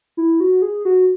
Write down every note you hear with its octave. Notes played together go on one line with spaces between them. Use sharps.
E4
F#4
G#4
F#4